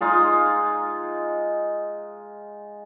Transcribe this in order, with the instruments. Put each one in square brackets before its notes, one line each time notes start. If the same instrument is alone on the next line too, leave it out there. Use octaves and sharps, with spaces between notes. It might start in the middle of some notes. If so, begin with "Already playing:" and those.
[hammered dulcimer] G#3 D#4 F4 G#4